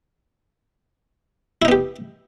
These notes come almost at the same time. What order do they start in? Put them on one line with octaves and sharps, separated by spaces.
E4 D#4 B3 G4